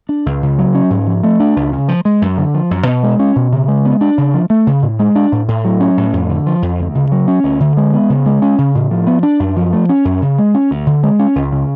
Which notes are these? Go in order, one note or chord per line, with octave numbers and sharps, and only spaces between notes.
D4
C#2
C#3
F#3
C#4
G#2
F3
A3
D4
C#2
C#3
F3
G#3
F#2
D3
F3
F#2
B2
G#3
C#4
B2
C#3
G#3
B3
D4
C#3
F3
A3
C#3
A2
G#3
D4
A2
A2
F#3
C#4
A2
F2
D3
F3
F2
D2
C#3
F#3
C#4
D2
D3
G#3
B3
C#3
G#3
C#4
C#3
A2
F3
B3
D4
F#2
F3
A3
C#4
F#2
C#3
G#3
C#4
D2
D3
G#3
C#4
C#2
C#3